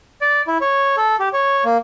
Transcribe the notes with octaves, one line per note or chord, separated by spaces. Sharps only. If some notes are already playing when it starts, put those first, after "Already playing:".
D5
E4
C#5
A4
G4
C#5
A#3